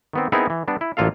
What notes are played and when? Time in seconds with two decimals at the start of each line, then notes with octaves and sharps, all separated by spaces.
0.13 D#3 B3 C4
0.32 B3 C4 D#4 E4 G#4 A#4
0.50 E3
0.68 G3 B3 D4
0.81 E4
0.97 A1 A#3 F4 A4 F5